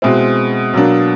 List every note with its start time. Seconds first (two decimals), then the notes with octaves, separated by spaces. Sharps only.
0.02 B2 G#3 C4 E4
0.74 B2 F#3 A#3 D4